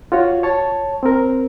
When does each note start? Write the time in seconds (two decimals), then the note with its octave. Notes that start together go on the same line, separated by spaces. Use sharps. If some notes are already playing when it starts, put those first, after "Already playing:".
0.12 F4 F#4 C#5
0.43 C#5 A5
1.03 C4 A#4